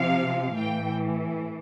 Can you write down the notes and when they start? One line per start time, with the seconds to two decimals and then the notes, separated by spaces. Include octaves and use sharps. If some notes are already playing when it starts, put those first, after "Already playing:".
Already playing: C3 F3 F5
0.55 A2 E3 G5